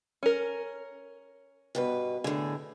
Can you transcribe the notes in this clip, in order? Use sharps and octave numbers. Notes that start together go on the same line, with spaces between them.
C#4 A#4
G2 B2 B4
A2 D3 G#4